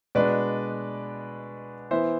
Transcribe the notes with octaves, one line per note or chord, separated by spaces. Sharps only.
B2 G#3 D4 B4 D5
E3 B3 E4 C5 E5